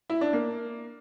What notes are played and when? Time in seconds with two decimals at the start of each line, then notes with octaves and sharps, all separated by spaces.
0.10 E4
0.21 D4
0.33 A#3